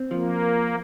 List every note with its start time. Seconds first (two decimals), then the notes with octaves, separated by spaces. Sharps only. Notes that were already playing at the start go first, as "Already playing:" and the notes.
Already playing: C4
0.11 F3 A#3